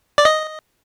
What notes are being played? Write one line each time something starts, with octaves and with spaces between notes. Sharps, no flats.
D5
D#5